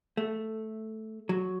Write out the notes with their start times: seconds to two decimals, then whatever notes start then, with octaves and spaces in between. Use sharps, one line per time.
0.17 A3
1.29 F#3